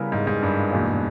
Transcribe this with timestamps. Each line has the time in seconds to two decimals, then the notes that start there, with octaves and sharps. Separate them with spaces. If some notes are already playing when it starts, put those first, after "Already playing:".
Already playing: C#3 G3 B3 E4 A#4
0.12 G#2
0.27 G#2
0.43 G2
0.73 E2 B2 A#3